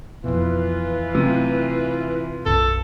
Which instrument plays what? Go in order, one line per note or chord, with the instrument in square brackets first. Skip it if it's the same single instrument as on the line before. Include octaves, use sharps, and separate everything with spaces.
[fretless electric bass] F2 B2 [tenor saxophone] E3 [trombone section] F4 B4
[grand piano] C3 [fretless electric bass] F#3 A3
[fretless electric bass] B1 F#2 B2 [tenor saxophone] A4